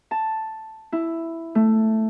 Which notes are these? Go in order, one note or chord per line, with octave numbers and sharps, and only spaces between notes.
A5
E4
A3